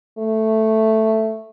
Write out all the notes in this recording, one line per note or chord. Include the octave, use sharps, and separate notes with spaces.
A3